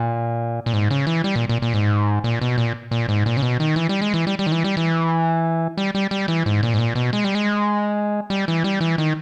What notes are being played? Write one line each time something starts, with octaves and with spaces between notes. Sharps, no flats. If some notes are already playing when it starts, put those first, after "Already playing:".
Already playing: A#2
A#2
G#2
C#3
E3
G3
A#2
A#2
A#2
G#2
A#2
B2
A#2
A#2
G#2
A#2
C#3
B2
D#3
E3
G3
G#3
E3
G3
G3
D#3
E3
G3
E3
G3
G3
G3
E3
G#2
A#2
G#2
A#2
B2
G#3
G3
G#3
G3
E3
G3
E3
D#3